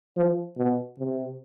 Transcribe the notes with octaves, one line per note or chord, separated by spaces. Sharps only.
F3
B2
C3